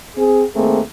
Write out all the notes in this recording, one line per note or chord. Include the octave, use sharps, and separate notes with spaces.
C4 G#4
D#2 A3 A#3 C4 G#4